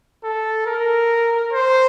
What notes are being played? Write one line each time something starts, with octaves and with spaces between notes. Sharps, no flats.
A4
A#4
C5